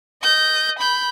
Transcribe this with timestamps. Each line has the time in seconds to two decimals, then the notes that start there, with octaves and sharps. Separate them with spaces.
0.23 D#5 G6
0.78 B5 G6